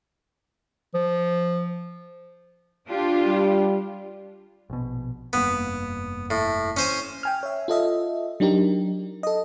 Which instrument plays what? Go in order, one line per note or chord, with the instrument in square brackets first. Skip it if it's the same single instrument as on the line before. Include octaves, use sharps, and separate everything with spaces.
[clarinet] F3
[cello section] D4 F4 G4
[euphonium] G3
[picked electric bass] A#1 B2
[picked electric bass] F1 G2 A#3 [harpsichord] B3
[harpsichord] A2
C#4 C5 G#5
[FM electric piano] G5 G#5 F6
C#5 E5
F4 A4 D#5 E5
F#3 D4 D#4 G4 A#4
A4 D#5